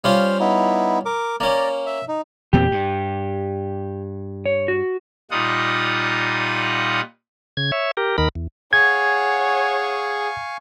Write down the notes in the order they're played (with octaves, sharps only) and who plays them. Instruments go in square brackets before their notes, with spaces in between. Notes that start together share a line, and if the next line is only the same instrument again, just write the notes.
[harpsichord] G3 C#4 F4 [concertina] C5 F5
[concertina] B3 D#4 E4
A#4 D6
[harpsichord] A#3 C#4 [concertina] D5 A#5
[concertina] E5
D#4
[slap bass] E2 A#2 C4 [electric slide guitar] G4
[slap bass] G2
[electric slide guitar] C#5
F#4
[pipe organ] A#2 G3 D#4 F4 F#5 D#6
[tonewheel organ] C#3 G#6
C#5 E5
G4 A#4
D#2 D#3 A#4 B5
E2
[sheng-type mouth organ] G#4 [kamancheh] C#5 F#5 [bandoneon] F5 G#5 C#6 [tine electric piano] G#6